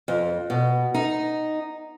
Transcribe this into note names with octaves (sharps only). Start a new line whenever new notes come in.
F2
B2
D#4